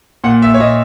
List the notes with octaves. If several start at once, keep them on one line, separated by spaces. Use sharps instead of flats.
A#2 F#5
E5
C#5
A#2 D#5